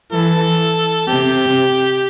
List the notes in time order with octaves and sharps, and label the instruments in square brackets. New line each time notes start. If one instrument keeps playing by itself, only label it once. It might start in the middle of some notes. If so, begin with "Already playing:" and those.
[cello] E3 [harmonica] A4
[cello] C3 [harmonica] G4